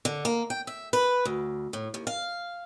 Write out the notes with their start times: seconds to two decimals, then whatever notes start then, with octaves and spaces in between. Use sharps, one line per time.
0.05 D3
0.25 A#3
0.50 G5
0.67 E5
0.93 B4
1.25 D2
1.73 A2
1.94 D#2
2.07 F5